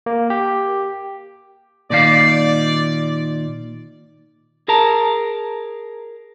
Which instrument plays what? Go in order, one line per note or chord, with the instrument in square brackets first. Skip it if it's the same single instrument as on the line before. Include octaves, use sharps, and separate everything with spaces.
[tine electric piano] A#3
G4
[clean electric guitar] A#2 D#3 F5 [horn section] D5
[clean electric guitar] G#4 A#4 A5 A#5